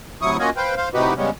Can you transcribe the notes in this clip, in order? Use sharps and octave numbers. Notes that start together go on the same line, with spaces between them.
D2 C3 F#3 E4 C#6 D#6
A#3 C#4 F4 F#4 D#5 G#5
B4 C5 F5 G5
C5 F5
A2 C3 D#4 F#4 G4 B4
C#3 G3 G#3 B3 C#4